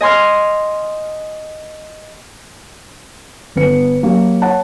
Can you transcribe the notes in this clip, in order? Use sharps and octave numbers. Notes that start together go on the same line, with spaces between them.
D#5 G#5 C6 F6
G1 B3 C#7
F#3 A#3 F#4 G4
C#5 F#5 A5